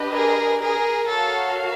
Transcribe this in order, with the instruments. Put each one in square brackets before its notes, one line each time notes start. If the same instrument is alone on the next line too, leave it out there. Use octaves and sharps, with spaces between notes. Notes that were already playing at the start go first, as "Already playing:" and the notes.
Already playing: [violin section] D4 G4 B4 D#5
[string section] G#4 A#4
G#4 A#4
[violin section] F#4 A#4 C#5 F5 [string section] A4